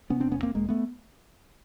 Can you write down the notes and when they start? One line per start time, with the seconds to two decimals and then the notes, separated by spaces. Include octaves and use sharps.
0.10 C3 B3 C#4
0.20 E1 C4 D4
0.32 B3 C#4
0.39 D2
0.43 A#3 C4
0.54 E1 G#3 A#3
0.69 A3 B3